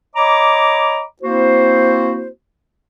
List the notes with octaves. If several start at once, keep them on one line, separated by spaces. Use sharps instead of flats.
C#5 D#5 A#5 B5 D6
A#3 C4 E4 F#4 C5